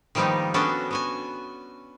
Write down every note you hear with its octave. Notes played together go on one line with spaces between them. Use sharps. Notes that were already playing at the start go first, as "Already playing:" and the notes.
D#3 F3 G3 A#3 B3 D#4
B3 C#4 D4 F#4 A4
B3 F#4 G#5